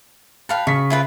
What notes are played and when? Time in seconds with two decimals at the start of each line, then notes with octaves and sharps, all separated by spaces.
0.49 B4 F5 G5 A5
0.67 C#3 C#6 B6
0.90 E4 F4 B4